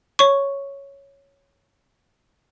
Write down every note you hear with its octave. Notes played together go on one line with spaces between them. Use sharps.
C#5 C#6